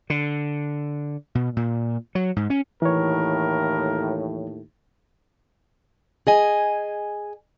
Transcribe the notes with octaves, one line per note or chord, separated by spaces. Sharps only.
D3
B2
A#2
F#3
G#2
C#4
D#2 A2 E3 A#4 C#5
G#4 D#5 G#5